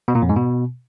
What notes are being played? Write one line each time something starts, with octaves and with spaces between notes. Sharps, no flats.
B2
A#2
F2
G#2
B2